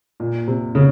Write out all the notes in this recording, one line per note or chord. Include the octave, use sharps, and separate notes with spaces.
A#2
C3
C#3